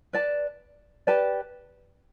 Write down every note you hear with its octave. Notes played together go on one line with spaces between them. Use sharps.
B4 D5 A5
G4 B4 D5 A5